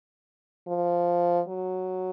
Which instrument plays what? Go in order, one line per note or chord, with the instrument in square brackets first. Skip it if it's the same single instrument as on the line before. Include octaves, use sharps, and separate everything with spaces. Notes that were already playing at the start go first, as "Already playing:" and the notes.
[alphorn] F3
F#3